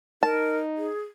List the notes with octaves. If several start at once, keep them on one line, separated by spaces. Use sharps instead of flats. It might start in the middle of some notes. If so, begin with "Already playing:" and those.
D#4 A#4 A5
G#4